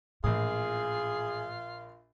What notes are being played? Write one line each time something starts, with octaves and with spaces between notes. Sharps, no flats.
A#1 A2 E3 F4 G#4 D#6